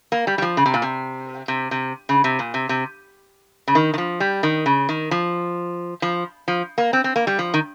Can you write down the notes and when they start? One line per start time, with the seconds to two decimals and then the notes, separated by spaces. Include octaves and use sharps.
0.12 A#3
0.27 G3
0.38 G3
0.42 F3
0.57 C#3
0.66 C3
0.74 A#2
0.82 C3
1.48 C3
1.71 C3
2.09 C#3
2.24 C3
2.39 A#2
2.54 C3
2.69 C3
3.68 C#3
3.75 D#3
3.94 D#3
3.98 F3
4.20 G3
4.43 D#3
4.66 C#3
4.89 D#3
5.11 F3
6.02 F3
6.48 F3
6.78 A#3
6.93 C4
7.04 C4
7.16 A#3
7.27 G3
7.39 F3
7.54 D#3